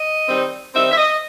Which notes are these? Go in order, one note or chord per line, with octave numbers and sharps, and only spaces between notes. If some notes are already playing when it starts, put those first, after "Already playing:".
Already playing: D#5
D#3 G3 C4 D#4
D#3 G3 C4 D#4 E5
E5
D#5